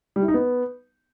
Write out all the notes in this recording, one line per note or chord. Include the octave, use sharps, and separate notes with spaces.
G3
E4
D#4
B3